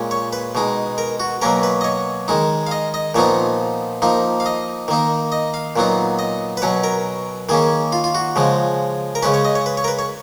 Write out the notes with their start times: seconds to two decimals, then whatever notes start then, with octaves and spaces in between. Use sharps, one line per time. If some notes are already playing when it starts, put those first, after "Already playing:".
Already playing: A#2 G#3 C#4
0.11 C#5
0.33 B4
0.55 B2 G#3 D#4
0.98 A#4
1.20 F#4
1.42 B2 F#3 A#3 C#4 A#4
1.63 B4
1.81 D#5
1.84 C#5
2.28 D#3 G#3 D#4
2.67 F5
2.71 D#5
2.94 D#5
3.15 A#2 F3 B3 D#4 C#5
4.02 F3 A#3 D#4
4.40 F5
4.46 D#5
4.88 D#3 A#3 D#4
5.32 D#5
5.54 F5
5.76 A#2 F#3 B3 D#4
6.19 D#5
6.57 B4
6.62 B2 F#3 C#4 C#5
6.84 A#4
7.49 D#3 A#3 C#4 G#4
7.92 F4
8.04 F4
8.15 F#4
8.36 C#3 F3 G#3
9.15 A#4
9.23 C#3 G#3 C#4 B4
9.34 C#5
9.45 D#5
9.55 C#5
9.66 B4
9.77 C#5
9.84 A#4
9.88 B4
9.99 C#5